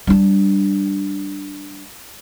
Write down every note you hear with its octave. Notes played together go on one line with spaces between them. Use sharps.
G3 D4